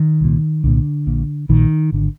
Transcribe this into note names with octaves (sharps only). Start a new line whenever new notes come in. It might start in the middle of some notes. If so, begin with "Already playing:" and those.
Already playing: D#3
C2 A#2
C2 A#2 D3
A#1 A#2
A#1 A#2 D#3
G#1 D3